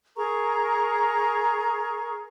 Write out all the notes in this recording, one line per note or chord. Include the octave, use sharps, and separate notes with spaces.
G#4 A#4 A#5 C#6